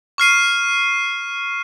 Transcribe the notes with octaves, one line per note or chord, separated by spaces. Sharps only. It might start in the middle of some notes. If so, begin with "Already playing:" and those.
C#6 F6 C7 D#7